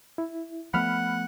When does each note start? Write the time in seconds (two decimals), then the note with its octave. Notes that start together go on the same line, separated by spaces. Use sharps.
0.18 E4
0.74 F3 A3 B3 F#5 B5 F6